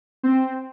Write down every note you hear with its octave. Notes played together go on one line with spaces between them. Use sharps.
C4